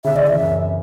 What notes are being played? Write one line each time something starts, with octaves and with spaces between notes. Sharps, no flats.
C#3 E5
D5
E3 E5
F#2